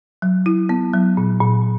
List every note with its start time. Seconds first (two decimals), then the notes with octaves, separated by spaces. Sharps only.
0.22 F#3
0.46 E4
0.69 B3
0.93 F#3
1.17 A#2
1.41 A#2